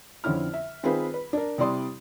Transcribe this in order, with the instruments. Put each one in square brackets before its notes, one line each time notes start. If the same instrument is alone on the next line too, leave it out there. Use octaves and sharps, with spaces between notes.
[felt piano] F2 D3 C4 C#4 E4 F6
E5
D#3 C4 D#4 F4 G#4 B4
B4
D4 A#4
C3 G3 E4 D5 C6 D#6